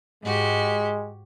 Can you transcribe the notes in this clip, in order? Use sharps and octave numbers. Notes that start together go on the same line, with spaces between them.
G#2 G#3 F#4 G4